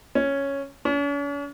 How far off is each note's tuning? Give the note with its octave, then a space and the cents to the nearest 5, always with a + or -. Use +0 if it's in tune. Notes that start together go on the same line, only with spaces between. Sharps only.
C#4 +0
C#4 +45